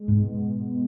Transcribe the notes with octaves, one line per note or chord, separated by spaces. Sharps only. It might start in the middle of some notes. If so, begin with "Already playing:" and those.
Already playing: G#3
G#2 B2
B3